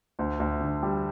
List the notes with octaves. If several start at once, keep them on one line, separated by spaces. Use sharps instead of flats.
D2
D2
D3
G3